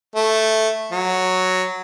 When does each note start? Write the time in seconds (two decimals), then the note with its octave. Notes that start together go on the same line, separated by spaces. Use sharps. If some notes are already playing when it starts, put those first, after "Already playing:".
0.15 A3
0.92 F#3